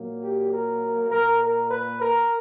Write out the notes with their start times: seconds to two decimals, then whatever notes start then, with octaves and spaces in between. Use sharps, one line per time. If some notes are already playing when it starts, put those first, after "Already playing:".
Already playing: A#2 F#3 A#3
0.22 G4
0.52 A#4
1.10 A#2 A#3 A#4
1.41 A#4
1.70 B4
2.00 A#4